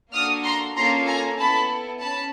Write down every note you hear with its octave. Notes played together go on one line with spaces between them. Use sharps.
A#3 D4 F#4 A4 D#6 F6
A#5 C6
A#3 C#4 F4 A4 A#5 C6
G#5 A#5
B3 E4 A4 A5 B5
C#4 A5 B5